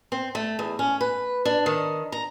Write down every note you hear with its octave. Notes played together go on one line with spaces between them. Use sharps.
C4
A3
E2
C#4
B4
D4
D#3
A#5